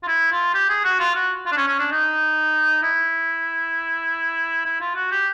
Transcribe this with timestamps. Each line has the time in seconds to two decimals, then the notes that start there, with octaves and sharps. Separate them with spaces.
0.03 F4
0.08 E4
0.32 F4
0.54 G4
0.69 G#4
0.84 F#4
1.00 F4
1.15 F#4
1.46 F4
1.52 D4
1.57 C#4
1.68 C#4
1.79 D4
1.92 D#4
2.83 E4
4.66 E4
4.81 F4
4.95 F#4
5.11 G4